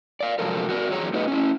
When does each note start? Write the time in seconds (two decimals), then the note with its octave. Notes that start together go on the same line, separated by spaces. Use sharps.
0.20 D5 F5
0.39 C3 F3 F#3 G#3 A4 A#4
0.69 F#4 A#4 D5
0.91 E2 F#3 G#4 C#5 A#5
1.13 A3 D#4 F#4 G#4 B4 D#5
1.28 C#4 E4